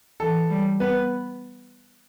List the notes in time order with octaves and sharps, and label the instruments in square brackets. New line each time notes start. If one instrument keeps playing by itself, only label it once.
[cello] E3 [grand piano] A4
[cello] G3
[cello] B3 [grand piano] B4